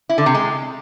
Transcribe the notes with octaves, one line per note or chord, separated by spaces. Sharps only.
E4
D3
C3
G#3